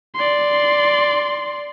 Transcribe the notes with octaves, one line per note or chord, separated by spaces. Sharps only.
D5 C6